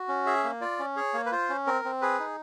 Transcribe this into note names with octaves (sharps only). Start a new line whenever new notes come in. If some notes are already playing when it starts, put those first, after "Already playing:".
Already playing: F#4
C#4
G#4 E5
A#3
F4 D5
C#4
G#4 C#5
A#3
B4
F4 C5
C#4
C4 A#4
C4
G#4 B4
D#4